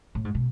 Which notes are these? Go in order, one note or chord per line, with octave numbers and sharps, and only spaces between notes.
A2
G#2
B2